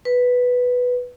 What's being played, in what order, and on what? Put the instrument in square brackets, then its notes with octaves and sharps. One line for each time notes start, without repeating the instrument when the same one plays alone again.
[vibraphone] B4